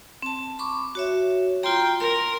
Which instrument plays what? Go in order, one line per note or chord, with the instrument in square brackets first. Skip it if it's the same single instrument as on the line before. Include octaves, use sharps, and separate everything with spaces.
[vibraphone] C4 A5
B5 C#6 D6
F#4 C#5 E5
[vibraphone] F4 A#5 [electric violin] G5 C6
[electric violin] A#4 [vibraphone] C6